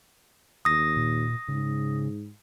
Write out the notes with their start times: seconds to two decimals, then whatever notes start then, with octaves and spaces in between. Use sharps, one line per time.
0.65 D#2 D#6 A#6
0.97 A#2
1.48 G#2 C#3